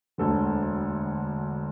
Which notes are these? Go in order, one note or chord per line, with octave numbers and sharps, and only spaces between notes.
E1 D2 D3 A4